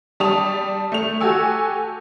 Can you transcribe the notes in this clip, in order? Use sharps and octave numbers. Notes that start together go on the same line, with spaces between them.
G3 G4 A5 D#6 F7
A3 F7
F#4 G4 A4 G#5 E6